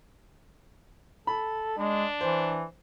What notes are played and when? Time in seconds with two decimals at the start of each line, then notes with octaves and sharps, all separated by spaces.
1.27 A4 B5
1.78 G#3 D4
2.21 E3 C5